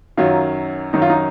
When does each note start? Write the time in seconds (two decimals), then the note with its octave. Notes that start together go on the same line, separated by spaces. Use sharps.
0.17 F#2 D#3 F#3 F4
0.93 F#2 D#3 F#3 D#4
1.02 F4
1.10 D#4